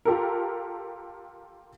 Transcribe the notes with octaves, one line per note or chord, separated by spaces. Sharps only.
F4 G4 A4 A#4